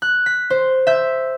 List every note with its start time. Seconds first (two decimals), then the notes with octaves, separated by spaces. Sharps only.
0.02 F#6
0.26 B6
0.50 C5
0.87 E5 G6